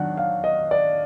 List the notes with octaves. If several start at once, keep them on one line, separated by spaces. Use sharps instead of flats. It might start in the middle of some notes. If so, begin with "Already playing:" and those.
Already playing: D#3 F#3 D4 F#5
F5
D#5
D5